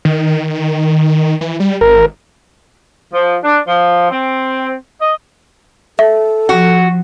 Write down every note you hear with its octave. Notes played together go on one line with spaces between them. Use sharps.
D#3
E3
G3
G#1 A#4
F3
D4
F3
C4
D#5
A4 E5
F3 F#4